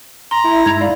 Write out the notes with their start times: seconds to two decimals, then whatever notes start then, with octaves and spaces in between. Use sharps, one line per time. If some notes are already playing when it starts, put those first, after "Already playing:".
0.31 A#5 C6
0.44 E4
0.66 G2 G#3 D#4 G#6 F7
0.81 D5 F5 B5